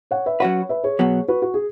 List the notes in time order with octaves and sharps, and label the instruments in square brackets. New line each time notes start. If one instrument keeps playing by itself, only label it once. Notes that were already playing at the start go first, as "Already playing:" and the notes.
[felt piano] C#5 F#5
B4 E5
[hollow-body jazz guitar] F#3 C#4 F#4 B4 [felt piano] C#5 F#5
[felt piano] B4 E5
G#4 C#5
[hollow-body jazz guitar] B2 F#3 B3
[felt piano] F#4 B4
F#4
G#4